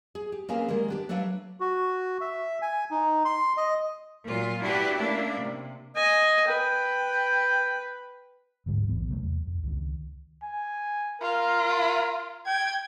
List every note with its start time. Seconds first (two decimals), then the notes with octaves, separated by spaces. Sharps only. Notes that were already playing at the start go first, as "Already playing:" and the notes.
0.15 G#4
0.32 G4
0.49 A#3 C4 C#4 G#4 B4 F5
0.68 D#3 G3 G#3 A#3
0.88 B3 D4 G4
1.09 F#3 G3 A3 D4 B4 F5
1.60 F#4
2.21 E5
2.62 G#5
2.91 D#4
3.25 C6
3.57 D#5
4.25 A#2 F#3 F4
4.61 D4 E4 F#4 G4 B4
4.97 A3 A#3 C#4 D4 E4
5.38 C3
5.96 D#5 G#5
6.48 B4 G5
8.66 A1 D2 G#2 G3
8.89 D#1 A#1 E3 B3
9.09 C3 F#3 G3 A3
9.23 E2
9.47 F2
9.63 C#2 D#3
10.43 G#5
11.22 F4 A#4
12.46 G5 G#6